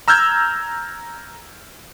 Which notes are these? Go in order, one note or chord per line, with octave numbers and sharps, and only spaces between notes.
A#5 E6 F6 G6 G#6